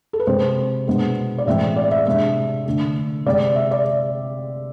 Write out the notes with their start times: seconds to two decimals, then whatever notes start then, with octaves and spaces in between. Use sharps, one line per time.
0.13 A4
0.20 B4
0.27 C3 G#3 C4 C5
0.87 B2 G#3 B3 D4
1.38 D5
1.46 A2 E3 G#3 C4 E5
1.76 D5
1.91 E5
2.07 C3 G#3 D4 E5
2.66 D3 A3 D4
3.26 C3 G#3 C4 D5
3.55 E5
3.71 D5